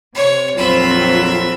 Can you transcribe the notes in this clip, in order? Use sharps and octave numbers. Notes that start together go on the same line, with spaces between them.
C3 C#5
A#1 F2 F#3 C4 F4 E5 B5